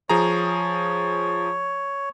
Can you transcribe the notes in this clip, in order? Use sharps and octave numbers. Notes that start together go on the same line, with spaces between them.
F3 G#4 C#5 A#5